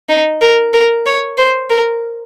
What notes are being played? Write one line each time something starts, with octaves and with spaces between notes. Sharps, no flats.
D#4
A#4
A#4
C#5
C5
A#4